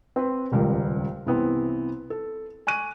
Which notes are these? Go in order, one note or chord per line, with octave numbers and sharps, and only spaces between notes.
C4 B4
D#1 C#2 G3 A#4
C2 E3 B3 C4
A4
G#5 C#6 F#6 D#7